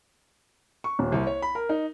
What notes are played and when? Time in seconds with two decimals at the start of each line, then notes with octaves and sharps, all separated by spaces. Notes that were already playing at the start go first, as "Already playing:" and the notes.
0.84 C#6
0.99 D#1
1.12 C2
1.27 C#5
1.42 B5
1.55 A#4
1.69 D#4